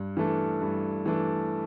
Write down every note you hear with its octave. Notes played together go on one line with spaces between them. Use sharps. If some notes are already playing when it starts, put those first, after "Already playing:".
Already playing: G2
E3 A3 D4
G2
E3 A3 D4